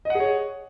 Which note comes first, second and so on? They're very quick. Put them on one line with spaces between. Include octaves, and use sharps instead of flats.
D#5 F#5 G#4 C#5